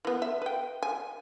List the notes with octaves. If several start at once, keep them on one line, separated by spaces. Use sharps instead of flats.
E3 B3
E5
B4 G5
G#5